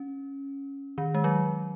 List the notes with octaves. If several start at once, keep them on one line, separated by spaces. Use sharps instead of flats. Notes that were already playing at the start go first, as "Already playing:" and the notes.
Already playing: C#4
D#3
G#3
F#3